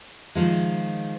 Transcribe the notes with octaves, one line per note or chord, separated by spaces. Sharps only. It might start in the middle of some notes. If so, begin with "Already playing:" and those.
D#3 F3 G#3